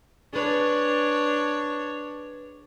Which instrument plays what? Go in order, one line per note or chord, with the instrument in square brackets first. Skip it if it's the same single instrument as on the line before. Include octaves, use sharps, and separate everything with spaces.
[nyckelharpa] D4 C#5 [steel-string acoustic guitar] G#4 B4